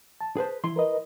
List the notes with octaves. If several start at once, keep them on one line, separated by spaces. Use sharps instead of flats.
A5
G#4 B4 C5
E3 E4 C6
A#4 B4 D#5